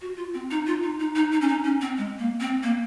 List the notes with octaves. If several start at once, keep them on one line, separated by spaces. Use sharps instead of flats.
F#4
F4
C4
D#4
F4
D#4
D#4
D#4
D#4
C#4
D#4
C#4
C4
G#3
A#3
C4
A#3